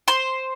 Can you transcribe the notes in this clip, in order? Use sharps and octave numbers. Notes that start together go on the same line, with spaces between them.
C5 C6